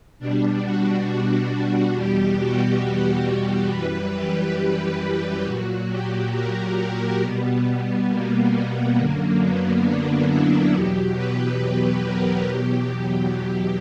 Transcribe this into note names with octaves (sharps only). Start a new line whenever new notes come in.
B2 G3 D4
F#4
E2 B2 G3 G4
F#4
F#4
G4
F#2 E3 G3 B4
G4
A#2 F#3 F#4
G4
A#4
A#4
B2 G3 B3
B3
A#3
B3
F#2 D3 F#3 A#3
B3
D4
E4
E2 B2 F#3 G4
B4
A#4
E2 B2 F#3 G4
G4